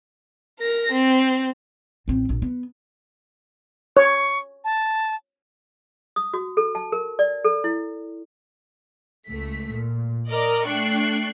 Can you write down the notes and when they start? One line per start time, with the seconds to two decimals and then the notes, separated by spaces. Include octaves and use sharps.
0.60 A#4 A#6
0.92 C4
2.08 A1 C4
2.29 A#1
2.42 B3
3.97 C#5 C#6
4.64 A5
6.16 D#6
6.34 F#4
6.57 A4
6.75 A5
6.92 A#4
7.19 D5
7.45 A4
7.64 E4
9.28 C#2 A3 B6
9.71 A#2
10.30 A#4 D5 D#5 A#5
10.66 A3 D4 G5 C#6 F#6 C7